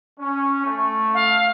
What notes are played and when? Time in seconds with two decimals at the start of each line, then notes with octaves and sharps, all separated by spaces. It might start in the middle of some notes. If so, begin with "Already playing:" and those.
0.19 C#4
0.65 A3
1.14 F5